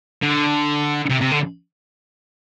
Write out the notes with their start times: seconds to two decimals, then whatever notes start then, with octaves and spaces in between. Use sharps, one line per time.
0.22 D3
1.10 C3
1.21 C3
1.31 D3